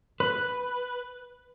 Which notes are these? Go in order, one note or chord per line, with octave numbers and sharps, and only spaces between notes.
B4